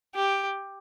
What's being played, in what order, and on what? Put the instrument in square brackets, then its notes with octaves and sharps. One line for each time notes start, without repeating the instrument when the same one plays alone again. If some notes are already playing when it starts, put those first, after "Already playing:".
[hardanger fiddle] G4